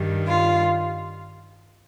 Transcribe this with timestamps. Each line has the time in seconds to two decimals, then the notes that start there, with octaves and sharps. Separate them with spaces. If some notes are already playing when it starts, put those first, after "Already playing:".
Already playing: G2 D#3 G3
0.27 F4